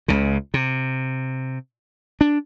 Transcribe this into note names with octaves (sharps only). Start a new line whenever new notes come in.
C#2 C#3
C3
D4